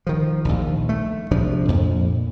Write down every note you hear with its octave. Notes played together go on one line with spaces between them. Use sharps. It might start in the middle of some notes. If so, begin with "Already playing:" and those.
D#3 F3
A#1 D#2
A3
A#1 C3 F3 D4
F2 A#2